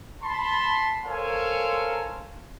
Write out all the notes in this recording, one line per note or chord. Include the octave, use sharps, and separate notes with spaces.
A5 B5 C6
A4 A#4 C5 C#5 F5 G#5